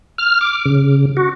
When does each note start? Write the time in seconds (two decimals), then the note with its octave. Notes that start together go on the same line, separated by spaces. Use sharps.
0.18 F6
0.41 D6
0.66 C#3
1.17 F#4